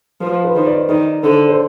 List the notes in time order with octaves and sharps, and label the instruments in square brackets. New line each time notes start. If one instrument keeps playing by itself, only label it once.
[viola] F3 [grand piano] B4
[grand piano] B4
[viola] D#3 [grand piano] C5
[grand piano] D5
D5
[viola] D#3 [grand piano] D5
[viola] D3 [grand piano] C5
[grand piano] C5